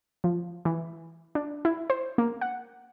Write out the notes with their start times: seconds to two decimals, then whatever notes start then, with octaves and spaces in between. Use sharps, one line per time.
0.24 F3
0.65 E3
1.35 D4
1.65 E4
1.90 C5
2.18 A#3
2.41 F#5